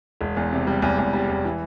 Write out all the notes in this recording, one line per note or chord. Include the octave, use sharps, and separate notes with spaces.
E1
E2
C3
G3
E2
E2
G3
E2
E3